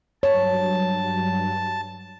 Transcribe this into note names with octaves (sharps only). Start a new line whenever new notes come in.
G2 F#3 C#5 A5